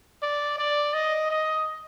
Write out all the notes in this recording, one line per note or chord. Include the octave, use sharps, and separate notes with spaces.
D5
D5
D#5
D#5